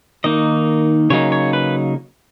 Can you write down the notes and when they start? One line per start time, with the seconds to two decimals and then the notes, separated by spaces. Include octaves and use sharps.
0.24 D#3 A#3 D#4 D#5
1.10 C#3 F#3 A#3 D#4 C#5
1.32 C#5
1.53 B4